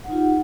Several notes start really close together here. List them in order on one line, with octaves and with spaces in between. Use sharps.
F#5 D#4 F4 G4